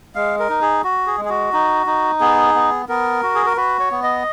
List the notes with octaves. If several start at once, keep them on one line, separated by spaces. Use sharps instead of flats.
G#3 F5
A#4
D#4
G#4
F#4
G#4
G#3
G#4
F#4
D#4
D#4
B3 G#4
B3
B3 A#4
F#4
G#4
A#4
F#4 B4
C#5
B3
D#5